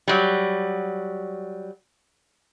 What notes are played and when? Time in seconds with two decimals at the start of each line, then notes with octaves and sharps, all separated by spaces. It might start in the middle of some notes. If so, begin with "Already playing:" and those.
0.08 F#3 G3